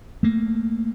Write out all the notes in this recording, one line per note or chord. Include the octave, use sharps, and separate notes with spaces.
A3 A#3